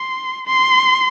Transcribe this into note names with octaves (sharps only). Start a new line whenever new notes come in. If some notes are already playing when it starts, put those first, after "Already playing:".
Already playing: C6
C6